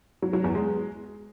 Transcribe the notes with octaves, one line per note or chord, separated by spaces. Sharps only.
F#3
F#3
E2
G#3